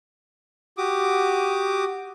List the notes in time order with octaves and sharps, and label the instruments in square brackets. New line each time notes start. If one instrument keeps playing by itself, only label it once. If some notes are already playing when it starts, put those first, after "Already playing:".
[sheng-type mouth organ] F#4 G4 D6 D#6